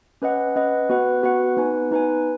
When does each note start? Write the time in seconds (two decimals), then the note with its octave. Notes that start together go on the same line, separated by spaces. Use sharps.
0.22 C#4 B4 D#5 F#5
0.56 C#4 B4 D#5 F#5
0.89 B3 F#4 B4 F#5
1.23 B3 F#4 B4 F#5
1.57 B3 D#4 B4 G#5
1.91 B3 D#4 B4 G#5